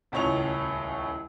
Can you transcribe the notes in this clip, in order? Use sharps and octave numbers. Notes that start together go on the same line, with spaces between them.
D#1 C#2 A2 C#5 D#5 F7